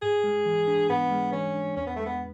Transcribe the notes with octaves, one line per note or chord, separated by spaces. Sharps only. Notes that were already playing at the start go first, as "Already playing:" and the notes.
G#2 G#4
G#3
E3
D4
G#2 B3
G#3
E3 C#4
D4
E2 C#4
B3
G#3 A3
B3